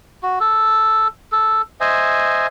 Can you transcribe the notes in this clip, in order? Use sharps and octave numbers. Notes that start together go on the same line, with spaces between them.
F#4
A4
A4
C5 D#5 E5 G#5